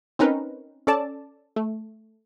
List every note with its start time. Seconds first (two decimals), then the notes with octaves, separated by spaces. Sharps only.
0.19 C4 C#4 D#4 A#4 B4
0.87 C#4 A4 D5 A5
1.56 A3